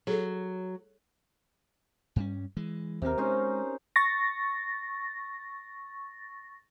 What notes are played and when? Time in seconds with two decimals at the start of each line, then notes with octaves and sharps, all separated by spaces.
0.07 F#3 G#4 A4
2.16 G2 G3 C#4
2.57 E3 G#3
3.02 D#2 C3 C4 A#4
3.18 G#3 C#4 D#4 C5
3.96 C#6 A6 A#6